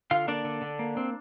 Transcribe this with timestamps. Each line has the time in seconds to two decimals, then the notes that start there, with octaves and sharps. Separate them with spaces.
0.11 D3 F4 F5
0.28 A#3 D4 D5
0.45 D3
0.62 D3
0.79 A#3
0.97 C4